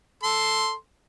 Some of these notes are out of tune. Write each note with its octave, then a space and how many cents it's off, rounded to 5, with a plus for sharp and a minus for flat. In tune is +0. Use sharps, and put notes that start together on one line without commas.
A4 +0 C6 +0